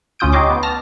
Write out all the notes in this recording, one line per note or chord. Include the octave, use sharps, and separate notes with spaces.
D2 C#4 F4 D#6 G6 D7
D#4 G4 C#5 D#5 C6 D6
B3
A5 F6 A#6